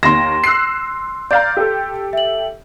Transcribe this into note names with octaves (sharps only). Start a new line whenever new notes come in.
D#2 D#3 C6 A#6 E7
E6 F#6 C7
D5 F5 A#5 G6
G4 A4
E5 F#7